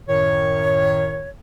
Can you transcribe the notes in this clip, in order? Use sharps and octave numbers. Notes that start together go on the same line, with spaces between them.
F#2 A2 D#3 C#5